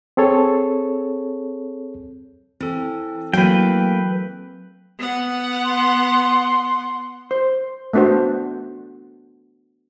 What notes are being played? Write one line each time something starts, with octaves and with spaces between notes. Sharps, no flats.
C4 G#4 A4 C#5
E3 C4 A4
E3 F#3 A3 A#3 B4 G5
B3 F#5
C6
C5
A3 B3 D4 F#4 C5